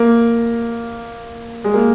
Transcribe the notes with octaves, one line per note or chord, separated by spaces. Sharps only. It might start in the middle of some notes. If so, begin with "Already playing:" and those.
Already playing: A#3
G#3
A#3